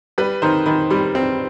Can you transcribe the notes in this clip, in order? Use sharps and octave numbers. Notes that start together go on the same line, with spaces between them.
G3 B4
D#3 C5
D#3 B5
G3 B5
C4